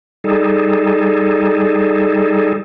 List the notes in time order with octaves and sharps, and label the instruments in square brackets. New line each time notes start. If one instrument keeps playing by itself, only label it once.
[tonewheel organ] G3 D#4 G#4 A4